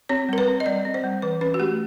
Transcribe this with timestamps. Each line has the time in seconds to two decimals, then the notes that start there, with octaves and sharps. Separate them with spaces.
0.09 C4 C#5
0.29 G3 A#4
0.38 B4
0.47 C4
0.60 D#5
0.66 G3 D5
0.85 C4
0.94 C5
1.04 G3
1.22 E3 B4
1.41 C#4 B4
1.54 F#4
1.60 A3 G4